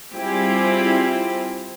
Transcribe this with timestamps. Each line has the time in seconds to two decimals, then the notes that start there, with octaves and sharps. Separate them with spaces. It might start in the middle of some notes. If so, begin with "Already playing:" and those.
0.14 G3 C4 E4 F4 G4 G#4